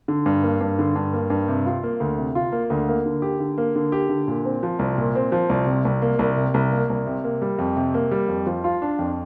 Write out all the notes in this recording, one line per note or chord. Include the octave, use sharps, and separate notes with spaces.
D3
G2
A#3
G2
D3
G2
A#3
G2
C3
F4
A#3
D2
C3
F4
A#3
D2
A#3
D3
G4
D3
A#3
D3
G4
D3
A#2
C4
F3
C2
A#2
C4
F3
C2
C3
C2
A#3
C2
C3
C2
A#3
C2
C3
A#3
G3
F2
C3
A#3
G3
F2
F3
F4
D4
F2